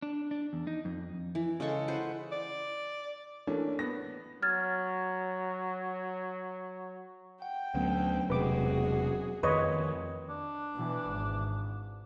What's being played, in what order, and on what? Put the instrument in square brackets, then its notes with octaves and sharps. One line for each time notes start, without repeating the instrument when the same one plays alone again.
[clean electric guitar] D4
D4
E2
D#4
F2
[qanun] E3
C#3 G#3 A4 C#6
B4 C5 F#5
[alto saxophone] D5
[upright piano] E3 A3 A#3 C#4 D4
B3 A#6
[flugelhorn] F#3 [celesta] F6 G#6 A6
[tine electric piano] F#5 [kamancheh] G5
[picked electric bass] D2 [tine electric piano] F#3 B3 C#4
[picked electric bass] E1 C3 G#3 [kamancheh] F#4 G#4 [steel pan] B4 D6
[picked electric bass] F2 D#3 [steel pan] B4 C#5 D#5 [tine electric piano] C6
[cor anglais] D4
[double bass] B2 E3
G#1